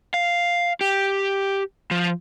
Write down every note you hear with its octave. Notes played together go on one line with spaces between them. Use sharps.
F5
G4
F3